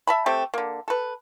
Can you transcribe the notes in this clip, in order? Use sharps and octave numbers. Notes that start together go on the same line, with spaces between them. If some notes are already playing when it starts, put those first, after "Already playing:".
E5 A5 B5
A3 C4 G4 A4
D3 A#3
A4 B4